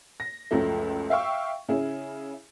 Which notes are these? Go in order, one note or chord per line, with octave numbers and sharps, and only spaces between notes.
A#6
C#2 F#2 F3 A3
E5 F5 G5 C#6 E6
C#3 E4 G#4